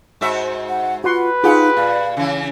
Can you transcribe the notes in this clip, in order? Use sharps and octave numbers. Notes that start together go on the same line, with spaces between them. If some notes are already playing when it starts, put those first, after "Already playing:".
G#2 F#4 E5
F#5
F4 F#4 B4 F#5 C6
D#4 F4 G4 G#4 F#5
A#2 F5
C#3 E3